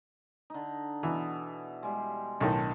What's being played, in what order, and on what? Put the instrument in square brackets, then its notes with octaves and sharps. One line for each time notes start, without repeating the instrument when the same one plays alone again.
[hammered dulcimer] D3 D#4
[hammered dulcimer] B2 B3 E4 [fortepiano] E3
[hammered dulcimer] G3 G#3
[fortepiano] B1 A2 D#3 [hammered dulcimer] D4 A4